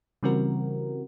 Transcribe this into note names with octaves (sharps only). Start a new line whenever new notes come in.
C#3 E3 G3 C4 F#4 A#4